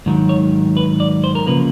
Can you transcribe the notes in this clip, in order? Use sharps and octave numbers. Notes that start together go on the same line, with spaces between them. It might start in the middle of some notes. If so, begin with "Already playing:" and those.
G#2 D#3 F#3
C#5
B4
D5
C5
A#4
C#3 F3 A#3 B4